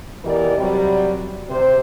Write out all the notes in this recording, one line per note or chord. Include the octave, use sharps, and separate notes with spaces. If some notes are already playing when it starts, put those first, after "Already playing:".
B2 E3 G4 A#4 D5 D#5
C3 F#3 G3
C3 C5